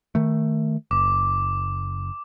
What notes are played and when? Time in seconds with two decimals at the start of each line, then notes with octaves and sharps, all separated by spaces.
0.15 D#3 A3
0.91 F#1 D6